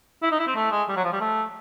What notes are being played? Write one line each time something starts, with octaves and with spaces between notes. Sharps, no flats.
E4
D#4
E4
C4
A3
G#3
G3
F#3
F3
G3
A3